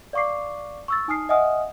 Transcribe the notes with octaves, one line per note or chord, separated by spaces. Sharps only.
D5 F5 C#6 D6 C7
C#6 E6 A6
D#4 G#5 D#6 F6 C7
D#5 E5 F#5 G#5 D#6 F6